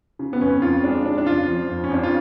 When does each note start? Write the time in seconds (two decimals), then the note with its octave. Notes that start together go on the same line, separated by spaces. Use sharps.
0.19 C#3
0.33 B3
0.41 F2 C#4
0.62 F2 F4
0.83 G#3 D4
1.05 C#3 D4
1.18 D4
1.26 F2 F4
1.48 F3
1.69 F2
1.84 C#4
1.90 F2 D4
2.03 F4